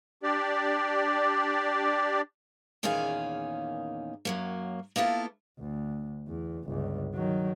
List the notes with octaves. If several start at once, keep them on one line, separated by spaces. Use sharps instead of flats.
D4 G4 D5
E2 A#2 D#3 C#4 G#4 F5
F#2 F#3 A#3
A#3 B3 E4 F4 A4
D2
E2
G1 C#2
D#3 F#3